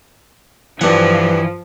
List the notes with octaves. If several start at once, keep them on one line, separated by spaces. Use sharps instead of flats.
G2 E3 F3 F#5